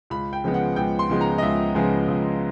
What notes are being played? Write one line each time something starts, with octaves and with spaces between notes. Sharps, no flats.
C#2 B5
G5
C#3 F3 G#3 B3
F#5
C#2 G5
C6
C#3 F3 G#3 B3
A#5
D#5
C#2 E5
C#3 F3 G#3 B3
C#2